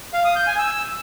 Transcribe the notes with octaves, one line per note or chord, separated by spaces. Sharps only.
F5
D#6
G6
G#5
E6